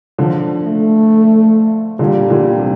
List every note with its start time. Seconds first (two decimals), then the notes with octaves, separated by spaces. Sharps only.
0.18 D3 F3
0.64 A3
1.99 A#2 D3 G3
2.30 A#2 D3
2.60 C3